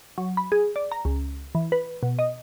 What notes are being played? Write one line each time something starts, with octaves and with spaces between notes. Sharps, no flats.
F#3
B5
G#4
D5
A#5
C#2
E3
B4
B2
D#5